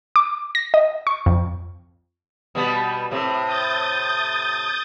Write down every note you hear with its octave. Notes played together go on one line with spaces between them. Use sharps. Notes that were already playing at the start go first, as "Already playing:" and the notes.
D6
A#6
D#5
C#6
F2
B2 G3 B3
A2 C3
D#6 G6 A6